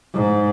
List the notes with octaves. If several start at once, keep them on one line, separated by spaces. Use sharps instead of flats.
G#2